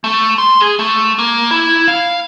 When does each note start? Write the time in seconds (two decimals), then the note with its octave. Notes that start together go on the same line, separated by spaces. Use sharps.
0.04 A3
0.38 C6
0.60 G#4
0.79 A3
1.18 A#3
1.51 E4
1.88 F5